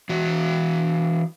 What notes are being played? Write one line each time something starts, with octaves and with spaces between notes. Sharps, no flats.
E3 F#4